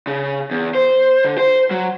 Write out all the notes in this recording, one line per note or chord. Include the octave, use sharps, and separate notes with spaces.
C#3
E2
C5
D3
C5
F#3